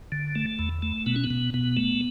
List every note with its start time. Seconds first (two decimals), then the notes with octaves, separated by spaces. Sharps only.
0.12 D3
0.35 A3
0.59 E2
0.82 A3
1.06 B2 B3
1.16 C#4
1.24 B3
1.30 B2
1.54 B2 B3
1.77 A3